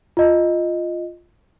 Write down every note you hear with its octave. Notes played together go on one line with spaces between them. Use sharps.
F4 D#5